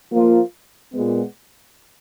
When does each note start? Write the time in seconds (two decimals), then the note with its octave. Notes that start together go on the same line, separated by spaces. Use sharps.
0.11 F3 A#3 F4
0.92 A#2 G#3 B3